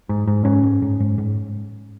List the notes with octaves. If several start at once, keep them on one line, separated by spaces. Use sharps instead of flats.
G#2
G#2
G#2 C#4
G#2
G#2
G#2
G#2